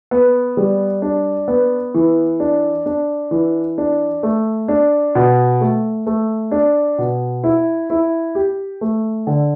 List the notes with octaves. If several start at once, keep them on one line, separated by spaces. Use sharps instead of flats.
B3
G3
D4
B3
E3
D4
D4
E3
D4
A3
D4
B2
A3
A3
D4
B2
E4
E4
G4
A3
D3